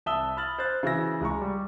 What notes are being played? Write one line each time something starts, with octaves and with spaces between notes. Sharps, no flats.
C2 E5 A5 D#6 E6 G7
B5 F6 A6 F#7
C5 F#6 A6
C#3 E3 F#4 E5 E6 A#6
C#2 G#3 A#5 C#6
G3